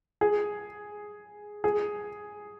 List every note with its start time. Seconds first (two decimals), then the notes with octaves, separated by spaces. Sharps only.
0.21 G#4
1.64 G#4